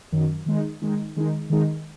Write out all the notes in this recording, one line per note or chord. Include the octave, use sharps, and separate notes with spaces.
F#2 D#3 F#3
D#3 G#3 D#4
D#3 G#3 D#4
D#3 G#3 D#4
D#3 G#3 D#4